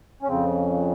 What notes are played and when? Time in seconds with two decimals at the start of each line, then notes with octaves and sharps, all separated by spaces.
0.23 C#4
0.28 F2 C#3 C4